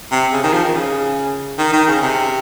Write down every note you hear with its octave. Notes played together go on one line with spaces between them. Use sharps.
C3
C#3
D#3
F3
D#3
C#3
D#3
D#3
C#3
C3